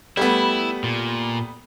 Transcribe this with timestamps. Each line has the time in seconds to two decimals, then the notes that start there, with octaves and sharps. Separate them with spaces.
0.17 G3 A3 B3 E4
0.84 A#2